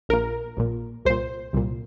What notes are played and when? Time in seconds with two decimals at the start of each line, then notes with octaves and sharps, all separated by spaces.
0.09 A#1 A#2 A#4
0.57 A#1 A#2
1.05 C2 A#2 C5
1.53 C2 A#2